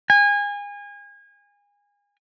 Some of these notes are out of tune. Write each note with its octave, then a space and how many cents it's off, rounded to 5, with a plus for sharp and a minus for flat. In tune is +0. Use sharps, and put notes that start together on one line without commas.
G#5 -30